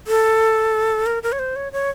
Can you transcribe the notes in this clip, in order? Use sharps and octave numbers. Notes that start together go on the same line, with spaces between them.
A4
A#4
A#4
C#5
C5
C#5
C#5